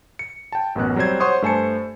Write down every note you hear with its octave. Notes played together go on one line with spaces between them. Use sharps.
C#7
G5 A5
A1 F#2 B2 F#6
F#3 G3 C4 C5 G#6
C5 C#5 F#5 C6 C#6 D#6
G2 A3 C5 G#5 A5 C#7